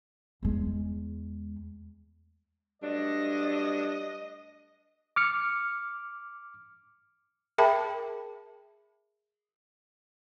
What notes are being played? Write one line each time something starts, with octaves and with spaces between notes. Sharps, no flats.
E2 G#3
G2 F#3 A3 D4 D#5
D6 F6 C#7
G#4 A#4 E5 G5 A5 B5